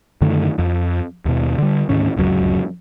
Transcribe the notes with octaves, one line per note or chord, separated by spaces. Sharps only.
F#2 D3 D#3 A3
F2 F3
D#2 B2
D3 G3
D2 G#2 D#3 C#4
D1 C#2 F#2 F#3